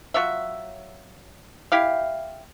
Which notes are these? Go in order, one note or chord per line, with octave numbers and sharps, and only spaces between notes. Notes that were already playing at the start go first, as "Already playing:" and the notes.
F#3 F4 C#5 E5
E4 G4 F5